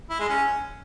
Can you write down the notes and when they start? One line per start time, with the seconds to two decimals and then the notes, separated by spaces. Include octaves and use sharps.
0.10 E4
0.20 G#3
0.29 C#4